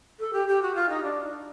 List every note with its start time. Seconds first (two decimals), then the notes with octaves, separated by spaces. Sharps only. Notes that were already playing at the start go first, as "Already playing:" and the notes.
0.20 A4
0.33 G4
0.48 G4
0.62 F#4
0.75 F4
0.89 D#4
1.04 D4